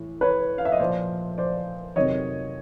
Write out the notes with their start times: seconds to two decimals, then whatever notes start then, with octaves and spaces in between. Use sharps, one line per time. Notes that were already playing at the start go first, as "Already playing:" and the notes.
Already playing: A2 E3
0.21 B4 C#5
0.58 F5
0.65 E5
0.72 D#5
0.80 A#2 F3 C5 D5
1.38 C5 D5
1.96 F2 C3 D#3 F#3 C#5 D#5